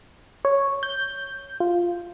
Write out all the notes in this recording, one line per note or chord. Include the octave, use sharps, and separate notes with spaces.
C#5
G6
F4